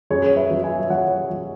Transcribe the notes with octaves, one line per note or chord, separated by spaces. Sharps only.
F#2 G#4 C#5
B4 E5
F#3
E5 G#5
E5
F#3 C#5 F#5
F#3